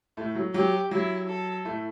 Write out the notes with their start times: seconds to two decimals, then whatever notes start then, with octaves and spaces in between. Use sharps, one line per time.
0.17 A2 A3
0.35 F#3
0.54 F#3 G4
0.91 F#3 E4
1.28 A4
1.65 A2 A3